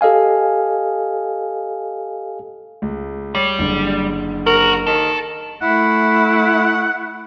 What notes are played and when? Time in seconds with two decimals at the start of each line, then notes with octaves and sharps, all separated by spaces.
0.01 G4 A4 D#5 F5 G#5
2.82 C#2
3.35 G3 C#5
3.59 F#1 D3
4.47 F#4 A#4
4.87 D#3 A4
5.62 A3 E4 F#5